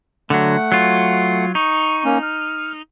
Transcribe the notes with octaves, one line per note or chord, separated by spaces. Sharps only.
D3 F#3 A3 F#5
F#3 F4
D#4 C#6
A#3 C#4
F6